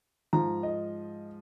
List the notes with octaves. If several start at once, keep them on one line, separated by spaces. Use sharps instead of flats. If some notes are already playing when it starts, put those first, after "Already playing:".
G#2 F3 A#5
D#5